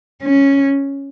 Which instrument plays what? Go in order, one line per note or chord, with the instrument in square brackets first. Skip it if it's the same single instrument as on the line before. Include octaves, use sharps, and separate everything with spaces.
[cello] C#4